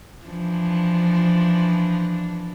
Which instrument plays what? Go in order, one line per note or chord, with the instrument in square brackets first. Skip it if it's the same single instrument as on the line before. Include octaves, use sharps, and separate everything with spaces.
[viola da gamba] E3 F3 D4